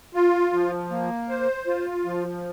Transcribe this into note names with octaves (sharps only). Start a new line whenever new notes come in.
F4
F3
A#3
C5
F4
F3